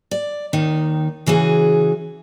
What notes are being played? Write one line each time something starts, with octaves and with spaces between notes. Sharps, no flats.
D5
D#2 D#3 D#4
C#3 E3 F#4 G#4